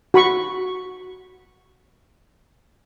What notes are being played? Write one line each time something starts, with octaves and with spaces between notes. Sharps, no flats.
F#4 B5 C#6